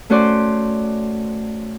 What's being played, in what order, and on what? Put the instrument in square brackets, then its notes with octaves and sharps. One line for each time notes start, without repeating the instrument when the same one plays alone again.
[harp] A3 C#4 F#4 C5 D5 C6